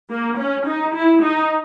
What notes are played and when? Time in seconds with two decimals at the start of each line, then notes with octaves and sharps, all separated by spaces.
0.10 A#3
0.38 C#4
0.66 D#4
0.95 E4
1.22 D#4